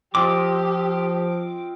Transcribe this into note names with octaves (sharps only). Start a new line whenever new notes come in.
F3 C4 F4 G4 D#5 D6